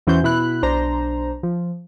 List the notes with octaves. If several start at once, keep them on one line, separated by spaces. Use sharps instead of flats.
E2 E3 C#4 F#4 C5 G6
B2 E4 B5 F#6
B1 D4 C5 A#5
F3